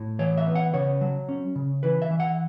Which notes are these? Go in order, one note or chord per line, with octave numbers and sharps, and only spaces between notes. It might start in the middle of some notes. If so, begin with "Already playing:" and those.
Already playing: A2
E3 C#5
E5
B3
F#5
C#3 C#5
F#3
C#4
C#3
E3 B4
E5
E3
F#5